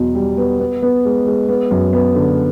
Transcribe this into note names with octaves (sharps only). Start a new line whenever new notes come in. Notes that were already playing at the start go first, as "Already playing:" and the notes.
Already playing: E2 B2 F#3
G3
B3
B3
B3
G#3
G#3
B3
F#2
B3
D3